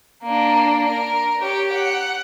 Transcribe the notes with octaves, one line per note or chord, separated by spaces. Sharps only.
A#3 D4
A#4
G4 C#5
F#5